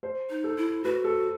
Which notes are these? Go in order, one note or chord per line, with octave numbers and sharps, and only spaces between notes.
C5
D#4
A4
E4
F#4 B4
A4